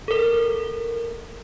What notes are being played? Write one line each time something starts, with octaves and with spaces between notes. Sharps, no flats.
A4 A#4